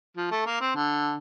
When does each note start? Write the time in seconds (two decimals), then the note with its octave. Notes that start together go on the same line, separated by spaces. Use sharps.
0.17 F3
0.31 A3
0.46 A#3
0.61 C4
0.75 D3